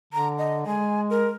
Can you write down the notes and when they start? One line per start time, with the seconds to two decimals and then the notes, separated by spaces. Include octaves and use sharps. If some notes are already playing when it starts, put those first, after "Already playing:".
0.13 D3 A#5
0.38 D#5
0.66 G#3 G#5
1.10 A#4